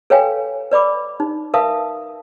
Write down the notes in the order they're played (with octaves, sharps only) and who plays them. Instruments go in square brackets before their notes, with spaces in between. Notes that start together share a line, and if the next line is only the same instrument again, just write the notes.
[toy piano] A4 B4 C#5 F5 G5 G#5
B4 D5 B5 D6
D#4
A#4 B4 E5 F5 A5 D#6